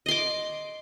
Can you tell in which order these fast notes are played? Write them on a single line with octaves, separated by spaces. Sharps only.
D#5 C6 D6